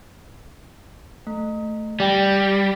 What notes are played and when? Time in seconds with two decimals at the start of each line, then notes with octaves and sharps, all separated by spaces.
1.27 A3
2.00 G3 D5 G5 A#6